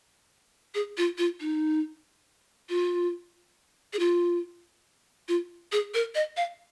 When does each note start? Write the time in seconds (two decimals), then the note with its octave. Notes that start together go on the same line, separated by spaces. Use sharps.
0.75 G#4
0.97 F4
1.18 F4
1.41 D#4
2.69 F4
3.93 G#4
3.99 F4
5.29 F4
5.72 G#4
5.94 A#4
6.15 D#5
6.37 F5